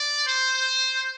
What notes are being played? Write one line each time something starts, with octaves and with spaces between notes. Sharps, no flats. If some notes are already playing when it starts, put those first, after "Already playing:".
Already playing: D5
C5